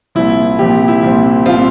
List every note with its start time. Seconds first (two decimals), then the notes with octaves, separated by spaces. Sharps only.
0.15 C2 A#2 F3 C4 E4
0.59 C2 A#2 F3 C4 G4
0.88 E4
1.03 C2 A#2 F3 C4
1.46 A#2 F3 C4 F4